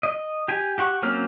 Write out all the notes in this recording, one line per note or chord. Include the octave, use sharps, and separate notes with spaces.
D#5
G4 G#5
G4 F#5 C#6
F#3 A#3 C4 C#4 F6